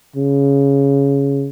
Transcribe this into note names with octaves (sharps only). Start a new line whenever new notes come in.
C#3